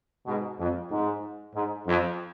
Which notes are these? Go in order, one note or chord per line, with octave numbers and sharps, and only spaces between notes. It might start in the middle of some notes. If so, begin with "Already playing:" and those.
G#2 B2
F2
G#2
G#2
F2